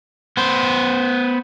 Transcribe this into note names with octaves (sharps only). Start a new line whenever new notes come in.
B3 C5